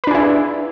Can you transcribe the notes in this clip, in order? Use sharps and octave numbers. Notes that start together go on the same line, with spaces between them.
D4 E4 G#4 B4